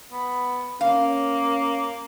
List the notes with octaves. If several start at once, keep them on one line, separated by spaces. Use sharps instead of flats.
B3
A#3 C#4 F5